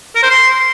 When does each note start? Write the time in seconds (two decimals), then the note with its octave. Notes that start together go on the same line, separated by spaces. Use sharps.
0.15 A#4
0.23 C5
0.30 C6